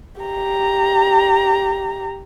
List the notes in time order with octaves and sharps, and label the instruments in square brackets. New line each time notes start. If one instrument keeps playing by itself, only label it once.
[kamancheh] G4 A#5